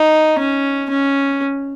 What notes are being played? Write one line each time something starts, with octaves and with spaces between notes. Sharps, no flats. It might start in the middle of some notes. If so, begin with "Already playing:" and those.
Already playing: D#4
C#4
C#4